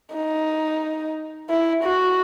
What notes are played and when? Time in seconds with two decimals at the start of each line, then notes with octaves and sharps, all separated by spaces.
0.14 D#4
1.49 E4
1.84 F#4